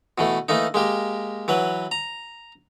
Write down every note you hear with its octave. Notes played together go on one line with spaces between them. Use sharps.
B2 E3 A3
E3 A3 A#3 D#4
G#3 A#3 G4
E3 F#3 B4
A#5